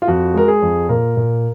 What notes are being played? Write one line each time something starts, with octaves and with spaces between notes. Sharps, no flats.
F4
F2 F#4
G#3 A#4
G#4
F2
A#2 A#4
A#2